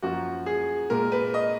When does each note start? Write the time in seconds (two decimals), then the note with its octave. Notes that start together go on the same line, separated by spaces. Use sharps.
0.02 F#2 F3 A#3 F#4
0.46 G#4
0.90 A#2 G#3 A#4
1.12 B4
1.34 D#5